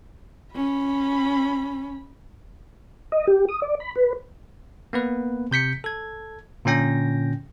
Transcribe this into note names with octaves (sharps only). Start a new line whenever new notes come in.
C#4 B5
D#5
G4
D#6
D5
B5
B4
A#3 B3 B4
C3 G6 B6 C#7
A4 G#6
A#2 D3 C#4 G5 A#6